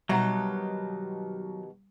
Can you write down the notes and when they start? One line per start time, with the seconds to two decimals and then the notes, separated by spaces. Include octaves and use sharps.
0.09 B2 D#3 F#3 G3 G4 E5 F#5 A#5